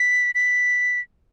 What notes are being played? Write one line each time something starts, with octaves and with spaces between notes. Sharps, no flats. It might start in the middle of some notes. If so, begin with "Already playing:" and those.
Already playing: B6
B6